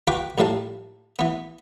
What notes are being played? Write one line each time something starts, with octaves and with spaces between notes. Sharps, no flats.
F4 F#4 B4 G5 D6
A#1 A2 G3 F5 A5
E3 B3